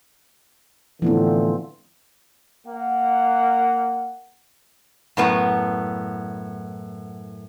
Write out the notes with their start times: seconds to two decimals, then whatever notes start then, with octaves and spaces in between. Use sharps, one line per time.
1.02 A2 D3 E3 F3 B3 C4
2.67 A#3 F#5
5.17 F#2 A2 B3